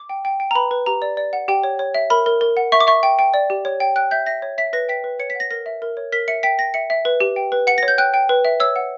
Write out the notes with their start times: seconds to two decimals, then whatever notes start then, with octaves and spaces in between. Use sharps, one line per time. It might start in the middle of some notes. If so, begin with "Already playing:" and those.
Already playing: D6
0.09 G5
0.25 G5
0.40 G5
0.51 A#5
0.55 B4 B5
0.71 B4
0.86 G4 A#5
1.02 D5
1.17 D5
1.33 F#5
1.48 G4 G5
1.63 C#5
1.79 C#5
1.94 E5
2.10 A#4 B5
2.26 A#4
2.41 A#4
2.57 F#5
2.72 E5 C#6
2.81 D6
2.87 E5 C#6
3.03 G5
3.19 G5
3.34 D5
3.50 G4
3.65 C#5
3.80 G5
3.96 G5 F#6
4.11 E5 G6
4.26 E5 A#6
4.42 C#5
4.58 E5 B6
4.73 B4 A#6
4.89 G5 B6
5.04 B4
5.19 C#5 C#7
5.30 B6
5.35 F#5
5.40 A#6
5.51 A#4 A#6
5.66 E5
5.82 A#4
5.97 C#5
6.12 A#4 B6
6.28 E5 C#7
6.43 G5 B6
6.59 G5 A#6
6.74 E5 C#7
6.90 E5
7.05 B4
7.20 G4
7.36 G5
7.52 B4
7.67 F#5 C#7
7.78 A#6
7.83 C#5
7.88 G6
7.98 G5 F#6
8.14 G5
8.29 B4
8.45 E5
8.60 C#5 E6
8.76 F#5